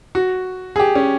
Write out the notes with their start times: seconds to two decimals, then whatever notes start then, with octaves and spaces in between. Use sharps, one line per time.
0.15 F#4
0.76 G#4
0.80 G4
0.95 C#4